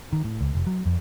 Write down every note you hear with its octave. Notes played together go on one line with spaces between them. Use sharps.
D#3
A2
C#2
F1
F#3
F2